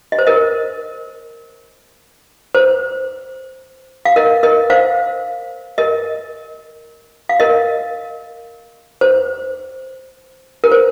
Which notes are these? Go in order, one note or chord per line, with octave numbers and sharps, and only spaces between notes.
D#5
C5
A#4 D#5
C5
F5
A#4 D#5
A#4 D#5
C5 F5
A#4 D#5
F5
A#4 D#5
C5
A#4
C5